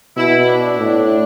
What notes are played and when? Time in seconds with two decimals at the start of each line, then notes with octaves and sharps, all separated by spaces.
0.17 B2 E4
0.47 D4
0.77 A2